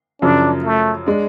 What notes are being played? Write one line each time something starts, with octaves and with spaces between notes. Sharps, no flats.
F#2 C#3 F3 D4
A3
G#3 D4